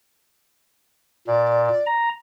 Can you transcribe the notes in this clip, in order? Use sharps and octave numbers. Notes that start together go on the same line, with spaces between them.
A#2 D5
A#5